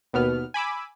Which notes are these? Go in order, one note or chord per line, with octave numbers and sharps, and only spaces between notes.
D#2 B2 B3 F6
G#5 B5 D6 E6